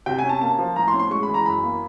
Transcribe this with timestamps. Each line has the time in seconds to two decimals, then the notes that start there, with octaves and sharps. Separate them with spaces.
0.06 C3 G5
0.19 G#5
0.24 C#4
0.29 A5
0.41 A#3 A5
0.59 F3
0.76 A2 A#5
0.88 C6
0.94 C#4
0.99 C6
1.11 G#3 C#6
1.23 B5
1.29 E3
1.34 A#5
1.46 F#2 B5
1.64 A#3